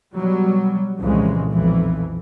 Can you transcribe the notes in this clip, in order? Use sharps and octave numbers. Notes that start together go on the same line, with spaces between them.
B2 F#3 G3
C2 F2 A#2 C#3 E3 G#3
B1 F2 E3